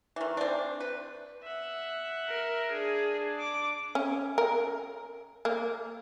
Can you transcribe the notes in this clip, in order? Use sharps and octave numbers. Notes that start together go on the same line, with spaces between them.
D#3 E3
C4 D4
B4
E5 F#5
A#4
D4 G#4
D6
C#4
A#4
A#3